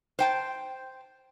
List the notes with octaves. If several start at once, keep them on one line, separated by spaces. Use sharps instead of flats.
C5 G5 A5